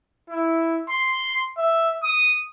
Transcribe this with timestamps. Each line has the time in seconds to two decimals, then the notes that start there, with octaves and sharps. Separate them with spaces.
0.30 E4
0.89 C6
1.58 E5
2.03 D#6